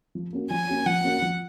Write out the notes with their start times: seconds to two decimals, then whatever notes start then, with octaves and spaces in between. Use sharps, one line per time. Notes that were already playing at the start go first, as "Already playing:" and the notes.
0.15 F3
0.33 A#3 C#4 F#4
0.50 F3 G#5
0.69 A#3 C#4 F#4
0.86 F3 F#5
1.04 A#3 C#4 F#4
1.22 F3